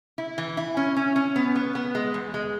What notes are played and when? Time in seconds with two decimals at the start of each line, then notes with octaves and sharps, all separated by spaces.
0.18 E4
0.38 E3
0.57 E4
0.77 C#4
0.96 C#4
1.16 C#4
1.36 B3
1.55 B3
1.75 B3
1.95 G#3
2.14 E2
2.34 G#3